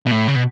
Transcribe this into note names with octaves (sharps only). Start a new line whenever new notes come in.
B2
A2
C#3
B2